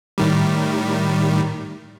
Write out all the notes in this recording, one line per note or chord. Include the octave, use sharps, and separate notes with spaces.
A2 D#3 G3